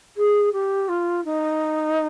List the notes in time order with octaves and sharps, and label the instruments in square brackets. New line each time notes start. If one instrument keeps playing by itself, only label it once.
[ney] G#4
G4
F4
D#4